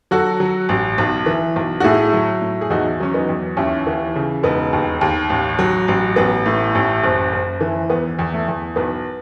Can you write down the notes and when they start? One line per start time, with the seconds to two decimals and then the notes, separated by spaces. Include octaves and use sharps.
0.11 F#3 F#4 A4
0.40 F#3
0.69 A1
0.98 B1
1.26 E3
1.56 B1
1.80 F#4
1.84 A2 E4 G#4
2.13 F#3
2.41 A2
2.61 G#4
2.70 E2 D#4 F#4
3.00 F#3 C#4
3.14 B3 D#4
3.29 E2
3.57 D#2 C#4 E4
3.87 E3
4.16 C#3
4.43 E1 B3 D#4
4.73 D#2
5.01 D#2
5.30 A1
5.59 F#3
5.88 A1
6.16 A1 B3
6.46 A2
6.75 A1
7.03 F#1
7.33 F#1
7.61 E3
7.90 E2 B3
8.19 E2
8.34 A3
8.48 E2
8.76 B1 B3